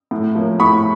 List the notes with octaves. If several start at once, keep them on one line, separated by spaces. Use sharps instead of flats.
A2
F3 A#3 C#4
A2 B5 C#6